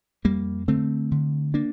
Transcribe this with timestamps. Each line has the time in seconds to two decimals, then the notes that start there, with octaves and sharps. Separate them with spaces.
0.24 F2 G3 A#3
0.68 D3 A3 C4
1.11 D3
1.54 A#3 D4